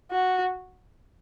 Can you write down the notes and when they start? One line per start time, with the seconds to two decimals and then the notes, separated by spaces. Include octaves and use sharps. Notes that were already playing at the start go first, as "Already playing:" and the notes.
0.11 F#4